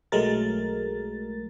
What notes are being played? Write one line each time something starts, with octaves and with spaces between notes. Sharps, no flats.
B1 F#3 G#3 A3 A#4 A6